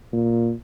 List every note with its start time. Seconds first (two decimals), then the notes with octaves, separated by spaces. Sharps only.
0.13 A#2